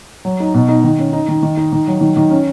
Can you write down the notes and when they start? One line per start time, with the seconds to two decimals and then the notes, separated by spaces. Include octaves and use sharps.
0.25 F#3
0.40 D#4
0.54 B2
0.69 D#4
0.84 D#3
0.99 C#4
1.13 D#4
1.28 D#3
1.43 D#3
1.57 D#4
1.72 D#3
1.87 F#3
2.01 D#3
2.17 D#3
2.31 C#4